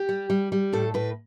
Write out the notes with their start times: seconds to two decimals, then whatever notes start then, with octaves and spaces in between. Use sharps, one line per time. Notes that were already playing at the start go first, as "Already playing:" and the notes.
Already playing: G4
0.09 G3
0.30 G3
0.52 G3
0.73 A2 A4
0.94 A2 B4